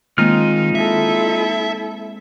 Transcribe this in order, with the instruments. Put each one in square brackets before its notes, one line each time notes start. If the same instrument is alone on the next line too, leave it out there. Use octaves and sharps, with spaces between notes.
[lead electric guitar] D#3 [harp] G#3 A#3 C4 [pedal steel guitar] D#4 F4 F6
[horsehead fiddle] E4 A4 [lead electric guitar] E5